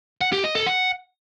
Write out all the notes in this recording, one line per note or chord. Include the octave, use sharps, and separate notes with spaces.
F#5
G4
D#5
A4
F#5